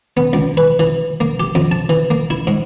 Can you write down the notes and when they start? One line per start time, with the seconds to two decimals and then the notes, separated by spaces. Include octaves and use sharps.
0.17 B3
0.33 C#2
0.57 B4
0.79 E3
1.20 A#3
1.40 G4
1.55 F2
1.71 A5
1.89 E3
2.10 A#3
2.30 E4
2.47 G#2